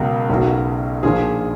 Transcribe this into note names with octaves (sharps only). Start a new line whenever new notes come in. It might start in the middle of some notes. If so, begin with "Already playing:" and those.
Already playing: C#2 B2 F#3 A#4
B1 B2 F#3
A#1 A#2 F3 G#4